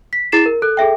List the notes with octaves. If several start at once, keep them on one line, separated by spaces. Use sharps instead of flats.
B6
E4 G#4 A6 C7 E7
A#4
A4 F#6
G#4 A4 E5 G5